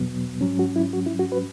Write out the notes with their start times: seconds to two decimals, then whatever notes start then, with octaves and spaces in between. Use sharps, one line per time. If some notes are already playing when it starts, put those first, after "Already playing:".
Already playing: E2 B2 F#3 B3
0.41 G#2 F#3 C#4
0.59 F#4
0.76 E4
0.93 F#4
1.06 E4
1.19 F#4
1.32 F#4 B4